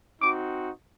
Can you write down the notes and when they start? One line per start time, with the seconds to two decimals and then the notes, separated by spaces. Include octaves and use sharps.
0.20 C4 D#4 F#4 D6